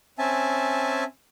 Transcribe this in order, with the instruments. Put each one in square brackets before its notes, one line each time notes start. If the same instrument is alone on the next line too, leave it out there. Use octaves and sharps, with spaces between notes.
[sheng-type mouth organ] C4 C#4 E5 G#5 A5